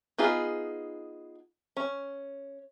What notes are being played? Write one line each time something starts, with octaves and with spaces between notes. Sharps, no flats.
B3 D#4 F4 G#4
C#4